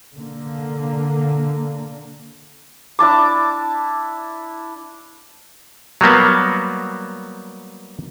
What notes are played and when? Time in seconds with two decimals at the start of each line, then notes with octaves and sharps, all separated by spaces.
0.16 D3 A#3
2.99 D4 E4 A5 D6
6.01 F#3 G3 A#3 B3